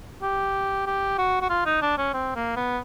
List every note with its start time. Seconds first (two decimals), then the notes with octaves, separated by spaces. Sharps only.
0.22 G4
0.87 G4
1.18 F#4
1.42 F#4
1.50 F4
1.66 D#4
1.82 D4
1.97 C#4
2.14 C4
2.35 A#3
2.56 B3